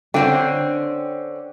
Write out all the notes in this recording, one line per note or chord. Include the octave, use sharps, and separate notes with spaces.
D3 C4 C#4 G5